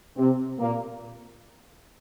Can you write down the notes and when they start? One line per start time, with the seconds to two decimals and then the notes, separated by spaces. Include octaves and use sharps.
0.17 C3 C4
0.59 A#2 A#3